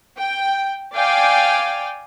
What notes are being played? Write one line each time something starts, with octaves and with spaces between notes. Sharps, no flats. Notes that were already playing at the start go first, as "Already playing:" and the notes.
G5
D5 F5 G5 G#5